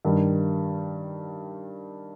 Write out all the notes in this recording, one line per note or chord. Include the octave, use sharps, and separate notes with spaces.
G2 D#3 G3